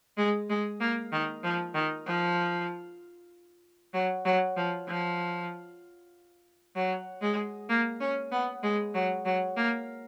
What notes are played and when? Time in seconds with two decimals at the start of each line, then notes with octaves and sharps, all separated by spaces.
0.17 G#3
0.49 G#3
0.80 A#3
1.12 D#3
1.43 F3
1.74 D#3
2.06 F3
3.93 F#3
4.25 F#3
4.57 F3
4.87 F3
6.75 F#3
7.22 G#3
7.69 A#3
8.00 C#4
8.32 B3
8.63 G#3
8.94 F#3
9.25 F#3
9.57 A#3